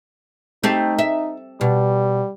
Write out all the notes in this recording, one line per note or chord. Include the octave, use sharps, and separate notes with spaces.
A3 C4 D#4 G4
E5
B2 G3